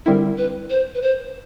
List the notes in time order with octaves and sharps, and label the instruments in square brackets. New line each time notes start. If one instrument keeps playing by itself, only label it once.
[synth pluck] D3 G3 C4 E4 [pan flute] A#4
[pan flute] B4
C5
B4
C5